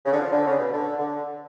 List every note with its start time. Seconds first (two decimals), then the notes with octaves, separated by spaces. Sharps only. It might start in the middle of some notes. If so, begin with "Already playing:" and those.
0.06 C#3
0.13 D3
0.20 F3
0.33 D3
0.46 C#3
0.59 B2
0.73 D3
0.99 D3